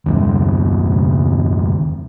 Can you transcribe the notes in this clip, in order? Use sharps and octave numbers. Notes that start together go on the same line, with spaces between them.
F#1 D#2